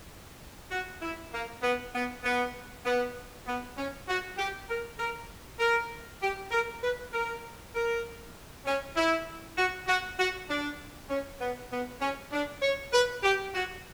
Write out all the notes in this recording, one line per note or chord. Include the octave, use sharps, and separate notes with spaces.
F#4
E4
A#3
B3
B3
B3
B3
B3
C#4
F#4
G4
A#4
A#4
A#4
G4
A#4
B4
A#4
A#4
C#4
E4
F#4
F#4
F#4
D4
C#4
B3
B3
C#4
D4
C#5
B4
G4
F#4